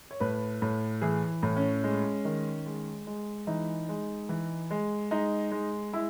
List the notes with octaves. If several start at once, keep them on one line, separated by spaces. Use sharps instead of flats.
C#5
A2 B4
A2
E3 G#4
A2
C#4
G#3
D#3
G#3
G#3
E3 D#4
G#3
E3
G#3
G#3 D#4
G#3
G#3 E4